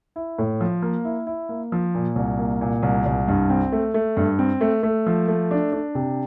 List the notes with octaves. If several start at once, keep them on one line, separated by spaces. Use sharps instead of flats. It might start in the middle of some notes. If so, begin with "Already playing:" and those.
E4
A2
F3
A#3
E4
E4
A#3
F3
A#2
C2
A#3
A#2
C2
C2
G2
C4
A3
A3
G2
C4
A3
A3
F3
A3
D4
D4
C3